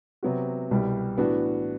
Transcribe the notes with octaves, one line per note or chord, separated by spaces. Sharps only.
C3 F#3 B3 F#4
C2 B2 G3
A2 E3 B3 D4 F#4